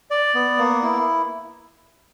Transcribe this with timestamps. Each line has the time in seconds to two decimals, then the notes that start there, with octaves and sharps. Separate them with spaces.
0.11 D5
0.35 B3
0.59 A#3
0.83 E4